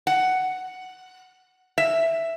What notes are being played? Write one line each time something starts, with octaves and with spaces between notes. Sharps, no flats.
F#5
E5